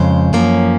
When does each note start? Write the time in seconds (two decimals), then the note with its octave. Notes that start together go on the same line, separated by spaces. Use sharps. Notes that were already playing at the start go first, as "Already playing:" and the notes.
Already playing: F2 C#3 G#3 C5
0.33 F#2 F3 A#3 C#4